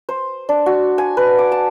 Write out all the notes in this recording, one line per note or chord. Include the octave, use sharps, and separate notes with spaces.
C5
D4
F#4
G#5
B4
D6
A5